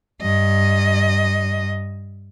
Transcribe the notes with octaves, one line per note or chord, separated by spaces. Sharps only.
G2 D#5